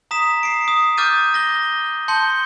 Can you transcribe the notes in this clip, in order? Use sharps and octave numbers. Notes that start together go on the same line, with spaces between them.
A#5 D#6 B6 E7
C7 D7
D#6
D6 F6 G6 A6 D#7
A#6 G7
A5 C6 G6 C#7 G7